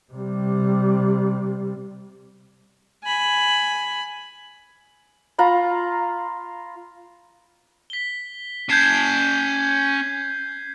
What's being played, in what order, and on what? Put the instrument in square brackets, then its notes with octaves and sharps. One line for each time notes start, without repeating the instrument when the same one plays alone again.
[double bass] C3 G3
[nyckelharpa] G#5 B5
[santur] F4 A#5 B5
[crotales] B6 G7
[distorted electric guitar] C#4 A5 [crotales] G6 G#6 C7